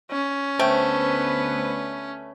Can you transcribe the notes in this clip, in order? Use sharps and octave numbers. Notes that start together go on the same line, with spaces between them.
C#4
D2 A3 B3 B4 C5 G5